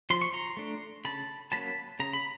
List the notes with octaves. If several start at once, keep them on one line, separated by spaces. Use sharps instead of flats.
F3 C6
C#6
A#5 C6
A3 D4
C#3 A5 B5
F#3 A#3 C#4 A5 B5
C#3 A#5
B5